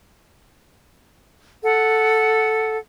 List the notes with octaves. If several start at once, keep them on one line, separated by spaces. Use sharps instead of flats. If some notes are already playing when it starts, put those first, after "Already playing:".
A4 F#5